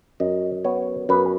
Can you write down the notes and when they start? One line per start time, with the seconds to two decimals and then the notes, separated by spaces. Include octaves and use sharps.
0.20 F#2 D#5
0.65 B3 C#5
1.09 F#2 B4